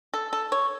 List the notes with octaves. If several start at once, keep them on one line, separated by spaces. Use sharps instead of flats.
A4
A4
C#5